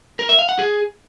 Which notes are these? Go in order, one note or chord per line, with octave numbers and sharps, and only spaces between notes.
A#4
E5
F5
F#5
G#4